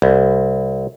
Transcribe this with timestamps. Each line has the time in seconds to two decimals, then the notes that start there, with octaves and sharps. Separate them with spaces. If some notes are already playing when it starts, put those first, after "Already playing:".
0.02 C2